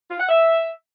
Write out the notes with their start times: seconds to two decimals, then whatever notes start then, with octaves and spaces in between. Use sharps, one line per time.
0.11 F4
0.20 F#5
0.29 E5